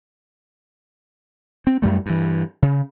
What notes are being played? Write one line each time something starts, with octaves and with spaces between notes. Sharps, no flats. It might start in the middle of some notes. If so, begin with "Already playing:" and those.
C4
F#2 G3 A3
G2 E3
C#3